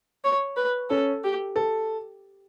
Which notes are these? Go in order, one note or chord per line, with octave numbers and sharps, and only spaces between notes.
C#5
B4
C#4 A4
G4
A4